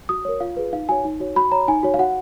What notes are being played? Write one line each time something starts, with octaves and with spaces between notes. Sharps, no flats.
F#4 D#6
A#4 C#5
F4 F5
G#4 B4
D#4 F5
F#4 C#5 G#5
D#4
F#4 C#5
F#4 B5
C#5 A#5
D#4 G#5
F#4 C#5
F5
F#4 F#5